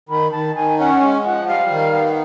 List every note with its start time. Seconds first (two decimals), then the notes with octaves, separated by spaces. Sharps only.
0.09 D#3 B5
0.32 D#3 A5
0.55 D#3 G#5
0.78 C#4 F#5
1.01 G#3
1.24 F3 F#5
1.47 G3 F5
1.71 D#3
1.94 B3